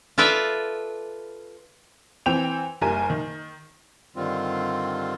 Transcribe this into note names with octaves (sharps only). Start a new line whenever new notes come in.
F4 A4 B4 D5 E5 F5
E3 C4 G5 F7
F#1 G3 A#4 G#5
D#3
G2 D3 D#3 G3 C4 F4